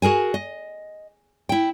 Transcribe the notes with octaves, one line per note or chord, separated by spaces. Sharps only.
F#4 G#4 A#4 G#5
D#5
E4 G5